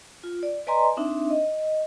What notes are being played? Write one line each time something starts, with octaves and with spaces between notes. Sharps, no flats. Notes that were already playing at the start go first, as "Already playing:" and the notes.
F4
D5
B4 D5 D#5 G#5 A#5 C6
C4 D4 D#4 E5
D#5